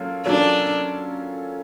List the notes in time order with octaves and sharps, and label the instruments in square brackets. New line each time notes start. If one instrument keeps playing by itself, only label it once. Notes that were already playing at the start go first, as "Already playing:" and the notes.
Already playing: [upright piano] F#3 A#3 C#4 F4 A4
[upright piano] F#3 A#3 C#4 F4 A4 [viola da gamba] D4